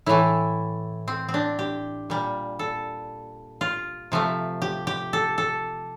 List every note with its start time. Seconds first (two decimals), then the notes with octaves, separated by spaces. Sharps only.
0.06 A2 E3 A3 E4
1.08 C4
1.28 C4
1.34 D4
1.59 G4
2.10 A#2 G3
2.59 A4
3.61 F4
4.12 C3 F3 A3
4.62 G4
4.87 G4
5.13 A4
5.38 A4